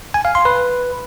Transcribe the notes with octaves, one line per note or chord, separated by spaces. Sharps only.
G#5
F5
C6
B4